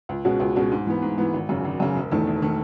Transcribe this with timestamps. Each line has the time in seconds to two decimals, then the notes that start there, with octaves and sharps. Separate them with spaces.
0.09 C#2
0.25 B2 G#3 C#4 F#4
0.40 C#2
0.55 B2 G#3 C#4 F#4
0.72 G#2
0.87 E3 B3
1.02 G#2
1.18 E3 B3
1.34 G#1
1.49 F#2 C#3
1.65 G#1
1.80 F#2 C#3
1.96 E1
2.11 E2 D#3 A3
2.27 E1
2.42 D#3 A3